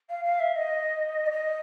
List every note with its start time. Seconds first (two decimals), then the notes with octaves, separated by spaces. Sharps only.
0.09 F5
0.24 F5
0.39 E5
0.55 D#5
1.26 D5
1.31 D#5